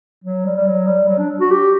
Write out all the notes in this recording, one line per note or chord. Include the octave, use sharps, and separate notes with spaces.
F#3
G3
G3
F#3
G3
F#3
D4
F#4
G4